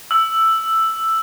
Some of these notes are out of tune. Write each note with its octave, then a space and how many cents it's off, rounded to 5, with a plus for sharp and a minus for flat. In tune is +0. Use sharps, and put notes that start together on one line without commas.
E6 +5